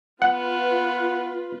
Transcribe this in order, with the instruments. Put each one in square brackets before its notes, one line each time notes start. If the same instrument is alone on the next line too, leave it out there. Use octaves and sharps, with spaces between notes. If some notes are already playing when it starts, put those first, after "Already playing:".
[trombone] B3 [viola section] F4 B4 [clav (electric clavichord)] F#5